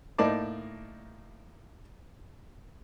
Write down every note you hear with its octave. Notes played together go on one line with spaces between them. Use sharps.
A2 A#3 D#4 D5 A5 D6